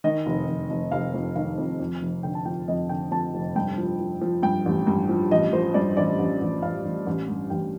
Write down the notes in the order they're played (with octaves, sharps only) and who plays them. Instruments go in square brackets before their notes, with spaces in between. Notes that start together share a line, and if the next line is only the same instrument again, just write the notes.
[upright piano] D#3 D#5
F1
F1
F1
F1 F5
F2
D#3 F5
F2
F2
F1
D3 G5
A5
F3 G5
F2 D#5
D3 G5
F2 A5
F1
G2 G5
F3
F3
F3
G2 G5
A1
G2
F3
A1 D#5
F3 C5
G2 D5
A1 D5
A1
A1
A1 F5
A1
A1
G2
A1 G5